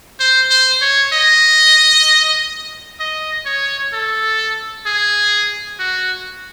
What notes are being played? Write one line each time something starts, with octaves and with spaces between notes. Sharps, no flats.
C5
C5
C#5
D#5
D#5
C#5
A4
G#4
F#4